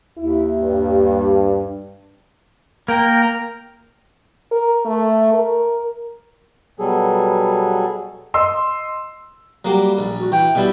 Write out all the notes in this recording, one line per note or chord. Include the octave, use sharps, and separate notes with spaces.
D#2 E4
G2
A#3 A#4 G5 A#5
A#4
A3
A#4
B2 F#3 G3 B3 G#4 A4
D#5 C6 E6
F#3 G3 A#3 G4
A#1
F#4
E3 G5
B2 G3 E4